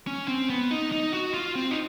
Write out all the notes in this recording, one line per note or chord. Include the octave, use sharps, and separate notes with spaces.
C#4
C4
B3
D#4
D#4
F#4
F4
C4
D#4